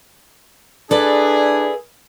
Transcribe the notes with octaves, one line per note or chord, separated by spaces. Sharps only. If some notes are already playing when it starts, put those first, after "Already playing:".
D4 E4 G#4 A4 B4 D5